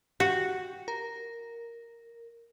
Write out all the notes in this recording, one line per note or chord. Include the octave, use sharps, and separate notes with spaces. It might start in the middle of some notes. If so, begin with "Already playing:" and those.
F#4 G4
A#4